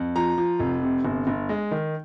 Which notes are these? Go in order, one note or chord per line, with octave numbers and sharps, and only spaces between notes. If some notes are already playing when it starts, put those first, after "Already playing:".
Already playing: F2
F3 A#5
F3
F1
C3
G1
G1
G#3
D#3